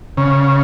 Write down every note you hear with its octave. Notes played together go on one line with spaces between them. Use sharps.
C#3